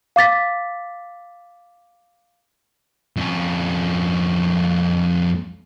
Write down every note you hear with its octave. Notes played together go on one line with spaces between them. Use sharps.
F5 D6 A6 B6
F2 C#4